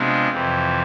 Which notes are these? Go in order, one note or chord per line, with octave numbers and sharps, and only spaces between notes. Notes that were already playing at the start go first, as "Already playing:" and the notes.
Already playing: C3 G#3 B3 D4 F4
F2 C3 E3